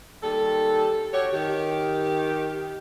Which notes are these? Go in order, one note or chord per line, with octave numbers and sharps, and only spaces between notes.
D#2 G3 A4
F#4 G4 C#5
D#3 G4